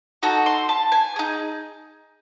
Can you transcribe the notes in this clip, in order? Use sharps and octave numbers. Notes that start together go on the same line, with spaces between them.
D#4 F#4 A4
C6
A5
G#5
D#4 G#4